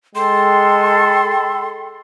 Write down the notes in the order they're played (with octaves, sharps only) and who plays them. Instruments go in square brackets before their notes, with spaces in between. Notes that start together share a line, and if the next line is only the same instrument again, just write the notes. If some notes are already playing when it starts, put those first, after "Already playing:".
[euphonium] G#3 [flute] A4 [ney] G5 [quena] C6